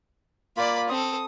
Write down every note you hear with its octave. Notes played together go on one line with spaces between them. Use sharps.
A#3 F4 D5 B5
C4 A4 D#6